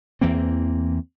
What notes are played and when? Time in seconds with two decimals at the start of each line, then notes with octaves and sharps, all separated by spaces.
0.21 E2 E3 A#3 C4